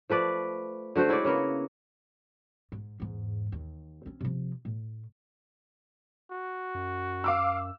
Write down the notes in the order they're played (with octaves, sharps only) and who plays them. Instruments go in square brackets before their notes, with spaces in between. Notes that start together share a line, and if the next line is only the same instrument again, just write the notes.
[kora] F3 A3 B4 D5
D3 A3 F#4 C5
G#3 E4 C#5 D5
C#3 A#3 B3 A#4
[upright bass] G#2
E2 G#2
D#2
C4 C#4
C3 F3
A2
[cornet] F#4
[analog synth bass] F#2
[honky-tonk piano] F5 D6 E6